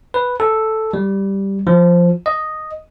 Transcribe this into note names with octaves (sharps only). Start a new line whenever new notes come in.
B4
A4
G3
F3
D#5